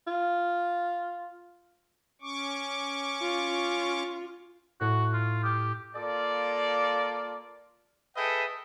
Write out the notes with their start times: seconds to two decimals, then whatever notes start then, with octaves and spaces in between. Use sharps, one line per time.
0.07 F4
2.21 C#4 C#6 D6
3.22 F4
4.81 A2 F#4
5.13 F4
5.44 G4 D#6 E6 G6
5.95 A#3 F4 A4 D5
8.16 G#4 A4 B4 D#5 E5 G5